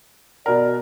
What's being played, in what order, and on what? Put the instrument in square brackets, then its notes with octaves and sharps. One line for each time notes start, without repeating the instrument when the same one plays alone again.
[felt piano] B2 A#4 [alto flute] D5